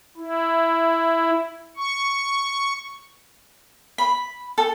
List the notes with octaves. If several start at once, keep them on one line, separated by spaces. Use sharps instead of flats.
E4
C#6
B5
A4